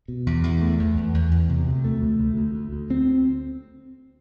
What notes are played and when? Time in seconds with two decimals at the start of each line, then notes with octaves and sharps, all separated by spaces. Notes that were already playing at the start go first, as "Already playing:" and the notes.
0.08 B2
0.27 E2
0.43 E2
0.62 A3
0.79 E2
0.97 E2
1.14 E2
1.31 E2
1.49 C3
1.67 D2
1.84 A3
2.02 D2
2.19 D2
2.37 D2
2.55 D2
2.72 D2
2.90 C4